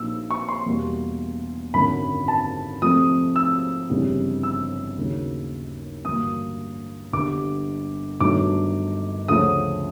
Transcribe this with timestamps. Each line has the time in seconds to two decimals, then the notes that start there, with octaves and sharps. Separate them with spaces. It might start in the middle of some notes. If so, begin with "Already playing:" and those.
Already playing: A#1 A#2 F#3 A#3 D#4 E6
0.31 C#6
0.49 C6
0.66 E2 B2 G3 A#3
1.74 G#1 F#2 D3 B5
2.28 A5
2.82 F2 C3 F3 A3 D#6
3.36 E6
3.89 G1 F2 C#3 E3 G3
4.43 E6
4.97 D#2 C#3 F#3
6.05 A1 G2 D3 F#3 A#3 D#6
7.13 G1 G2 D3 G3 D6
8.20 G1 G2 D#3 F#3 A3 D6
9.28 D2 C#3 F3 A3 C#4 D#6